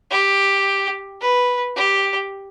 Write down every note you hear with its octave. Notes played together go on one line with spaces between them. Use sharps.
G4
B4
G4